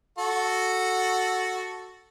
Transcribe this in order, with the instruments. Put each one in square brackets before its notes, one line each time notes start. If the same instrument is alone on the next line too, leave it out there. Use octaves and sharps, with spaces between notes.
[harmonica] F#4 A4